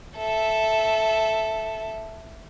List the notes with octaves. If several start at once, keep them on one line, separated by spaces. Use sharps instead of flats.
A4 E5